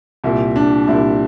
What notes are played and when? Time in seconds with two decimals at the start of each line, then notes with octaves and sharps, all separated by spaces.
0.24 C2 A#2 G3 E4
0.56 D4
0.88 C2 A#2 G3 E4